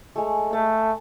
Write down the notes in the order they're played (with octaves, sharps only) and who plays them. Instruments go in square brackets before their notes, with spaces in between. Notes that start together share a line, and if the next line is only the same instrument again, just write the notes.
[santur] G#3 A3
[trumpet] A3 [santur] A5